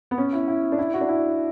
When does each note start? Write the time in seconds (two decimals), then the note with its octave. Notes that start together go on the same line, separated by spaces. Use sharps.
0.11 B3
0.18 C#4
0.33 E4
0.48 E4
0.72 D4
0.79 E4
0.93 F#4
1.01 D4
1.09 E4